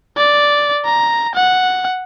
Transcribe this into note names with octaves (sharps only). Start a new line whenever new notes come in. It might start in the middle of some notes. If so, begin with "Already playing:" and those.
D5
A#5
F#5